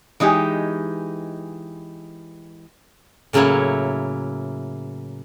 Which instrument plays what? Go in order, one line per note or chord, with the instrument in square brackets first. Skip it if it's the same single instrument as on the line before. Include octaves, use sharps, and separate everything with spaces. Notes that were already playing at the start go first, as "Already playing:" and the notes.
[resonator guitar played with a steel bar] E3 G#3 D#4 G4
[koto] A2 C#3 F#3 A#3 E4 C#5